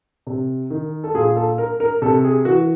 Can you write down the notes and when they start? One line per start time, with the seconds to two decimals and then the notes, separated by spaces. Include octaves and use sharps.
0.27 C3
0.70 D#3
1.04 A4
1.14 A#2 G#4
1.36 A4
1.58 A#4
1.80 A#4
2.02 C3 A4
2.24 G#4
2.45 E3 F#4